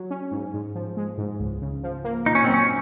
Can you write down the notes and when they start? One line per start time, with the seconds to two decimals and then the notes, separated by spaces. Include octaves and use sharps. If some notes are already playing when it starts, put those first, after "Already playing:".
Already playing: F#3
0.10 C#4
0.31 G#2
0.54 G#2
0.75 F3
0.97 G#3
1.18 G#2
1.40 C#2
1.62 C#3
1.83 F3
2.04 A#3
2.26 A#2 D#4
2.35 C#4
2.44 F#3 C4
2.54 C#4